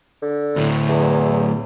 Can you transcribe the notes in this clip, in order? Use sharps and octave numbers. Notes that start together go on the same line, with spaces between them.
D3
D2 A2
E2